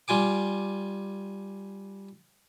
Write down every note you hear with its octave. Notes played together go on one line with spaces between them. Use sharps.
G3 F4 G#5 D6